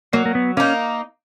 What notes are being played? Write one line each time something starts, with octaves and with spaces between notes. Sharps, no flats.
F#3 A#3
A#3
B3
A#3 C#4 D#4